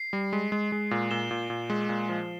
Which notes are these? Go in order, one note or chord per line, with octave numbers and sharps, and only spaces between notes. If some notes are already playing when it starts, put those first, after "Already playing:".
Already playing: C7
G3
G#3
G#3
G#3
A#2
A#2 E7 G7
A#2
A#2
G#3
A#2
F3